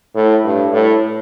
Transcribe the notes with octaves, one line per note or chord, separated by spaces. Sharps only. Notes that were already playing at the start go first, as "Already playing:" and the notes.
A2
G2
A2